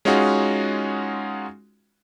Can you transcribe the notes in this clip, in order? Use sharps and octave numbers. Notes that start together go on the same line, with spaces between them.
G#3 C#4 D#4 F4 F#4 G#4